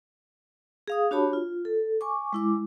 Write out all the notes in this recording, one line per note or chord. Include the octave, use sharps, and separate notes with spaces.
G#4 F5 D#6
D4 F#4 G4 C#5 A5 B5
F4
A4
G#5 C#6 D6
G#3 E4 D6